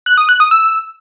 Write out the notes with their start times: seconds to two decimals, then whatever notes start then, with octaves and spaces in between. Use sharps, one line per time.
0.06 F#6
0.18 D#6
0.29 F#6
0.40 D#6
0.51 E6